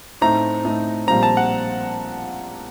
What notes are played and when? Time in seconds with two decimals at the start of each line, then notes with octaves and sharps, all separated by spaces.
0.21 A2 A3 C4 D#4 A#5
0.65 A2 A3 C4 D#4
1.07 A#1 A#2 G3 C4 A#5
1.23 A5
1.37 F#5